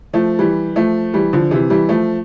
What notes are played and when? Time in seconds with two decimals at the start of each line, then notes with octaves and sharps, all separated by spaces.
0.13 F3 A3
0.39 E3 G3
0.76 F3 A3
1.13 E3 G3
1.33 D3 F3
1.51 C3 E3
1.70 E3 G3
1.89 F3 A3